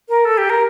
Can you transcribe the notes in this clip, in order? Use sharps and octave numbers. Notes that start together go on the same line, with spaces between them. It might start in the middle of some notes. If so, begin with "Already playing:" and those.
A#4
A4
G4
A#4